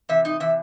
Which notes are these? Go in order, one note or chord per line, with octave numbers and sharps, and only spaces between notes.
C3 E3 E5
D#4 D#5
C3 E3 E5